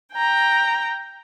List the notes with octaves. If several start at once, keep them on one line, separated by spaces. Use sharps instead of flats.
G5 A#5